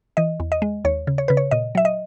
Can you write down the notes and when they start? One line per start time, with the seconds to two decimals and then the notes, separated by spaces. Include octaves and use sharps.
0.17 E3 D#5
0.40 E2
0.52 D#5
0.62 G#3
0.85 D#2 C#5
1.07 C#3
1.18 C#5
1.28 C#3 B4
1.37 C#5
1.51 A#2 D#5
1.75 F#3 E5
1.85 D#5